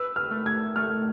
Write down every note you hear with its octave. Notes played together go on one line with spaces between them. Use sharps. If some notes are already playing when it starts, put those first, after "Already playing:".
Already playing: B4 E6
F6
A3
G#6
A3 F6